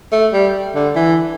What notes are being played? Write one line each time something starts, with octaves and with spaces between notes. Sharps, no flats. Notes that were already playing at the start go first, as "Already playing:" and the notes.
A3
G3
D3
E3